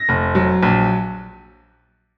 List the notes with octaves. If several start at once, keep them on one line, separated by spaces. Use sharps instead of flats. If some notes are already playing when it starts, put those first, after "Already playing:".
Already playing: A#6
F1
F#3
A#1